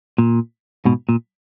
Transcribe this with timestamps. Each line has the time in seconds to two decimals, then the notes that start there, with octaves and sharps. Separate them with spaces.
0.18 A#2
0.85 G#2 B2
1.09 A#2